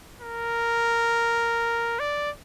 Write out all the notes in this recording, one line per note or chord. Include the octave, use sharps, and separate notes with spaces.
A#4
D5